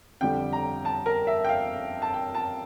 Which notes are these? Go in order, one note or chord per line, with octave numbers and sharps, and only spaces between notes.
F2 D3 G3 G5
A#5
A5
A#4
E5
G5
F5
A5
G5
A5